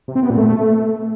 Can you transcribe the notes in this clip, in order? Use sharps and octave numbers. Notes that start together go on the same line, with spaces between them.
C3
C4
B3
A#2
A3